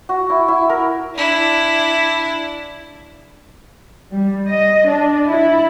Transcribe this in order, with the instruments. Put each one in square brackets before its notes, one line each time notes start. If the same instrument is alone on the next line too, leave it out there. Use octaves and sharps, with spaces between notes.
[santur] F#4
E4
E4
A#4
[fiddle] D4 E4
[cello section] G3
D#5
D4
E4